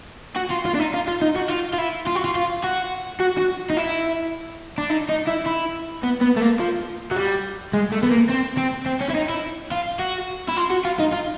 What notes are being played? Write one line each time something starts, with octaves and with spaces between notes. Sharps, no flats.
F#4
F4
F4
D4
D#4
F4
F4
D#4
F#4
F4
F4
E4
F4
F#4
F4
F4
F#4
F#4
F#4
D#4
E4
D4
D#4
D#4
E4
E4
B3
B3
A3
A#3
F3
F#3
G3
G#3
A3
B3
A#3
C4
C4
C4
C#4
E4
D#4
E4
F4
F#4
E4
F4
F#4
F4
D#4
F4